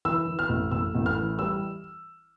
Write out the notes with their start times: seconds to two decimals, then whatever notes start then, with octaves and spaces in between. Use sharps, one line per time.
0.05 E3 E6
0.27 E3
0.39 F6
0.49 A1
0.71 A1 E6
0.95 A1
1.06 F6
1.16 E3
1.39 G3 E6